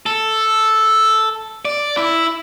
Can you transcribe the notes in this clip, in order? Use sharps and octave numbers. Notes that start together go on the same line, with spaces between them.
A4
D5
E4